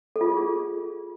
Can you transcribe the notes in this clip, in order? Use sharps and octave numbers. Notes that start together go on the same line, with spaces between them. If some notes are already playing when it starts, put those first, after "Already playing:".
A4
F4
G#4
F4
G#4